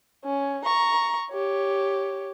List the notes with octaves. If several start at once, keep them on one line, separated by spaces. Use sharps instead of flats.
C#4
A#5 C#6
G4 C#5